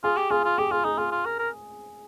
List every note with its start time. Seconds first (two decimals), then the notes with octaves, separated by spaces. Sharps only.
0.04 F4 G#4
0.17 G4
0.30 F4 G#4
0.44 F4
0.58 G4 G#4
0.71 F4 G#4
0.85 D#4 G#4
0.98 F4 G#4
1.12 F4
1.26 A#4
1.39 A#4